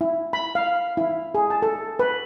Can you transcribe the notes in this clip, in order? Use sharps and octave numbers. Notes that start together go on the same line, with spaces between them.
E4
B5
F5
E4
G#4
A5
A4
B4